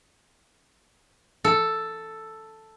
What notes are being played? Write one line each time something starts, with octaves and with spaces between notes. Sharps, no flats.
A4